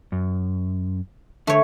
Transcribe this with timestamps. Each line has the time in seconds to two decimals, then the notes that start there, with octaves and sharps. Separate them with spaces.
0.12 F#2
1.47 D3 A3 C#5